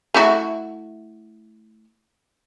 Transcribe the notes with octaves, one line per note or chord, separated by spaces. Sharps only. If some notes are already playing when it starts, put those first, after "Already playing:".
A3 E4 F#4